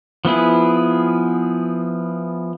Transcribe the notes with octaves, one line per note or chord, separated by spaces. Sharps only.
F3 B3 E4 G#4